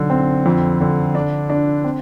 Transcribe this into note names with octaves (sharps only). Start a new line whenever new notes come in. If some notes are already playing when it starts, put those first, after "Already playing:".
Already playing: B1 D3
C4
F2
D3
D4
D4
C4